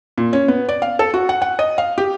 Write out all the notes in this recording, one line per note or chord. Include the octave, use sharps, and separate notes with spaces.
A#2
C#4
B3
D5
F5
A4
F#4
F#5
F#5
D#5
F5
G4